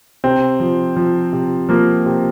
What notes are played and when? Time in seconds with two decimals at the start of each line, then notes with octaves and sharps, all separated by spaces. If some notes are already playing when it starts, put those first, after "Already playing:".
0.24 C3 C4
0.60 F3
0.96 F3
1.33 C3
1.69 F3 A#3
2.06 C3